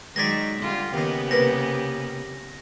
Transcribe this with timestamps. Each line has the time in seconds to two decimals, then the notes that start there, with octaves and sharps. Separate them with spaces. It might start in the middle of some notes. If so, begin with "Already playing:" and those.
0.16 D#3 F#3 G#3 G#4 D5 A#6 B6
0.58 D3 G3 F4
0.94 D#2 C#3 B3 G4 D#5
1.31 C2 A#3 B4 A#6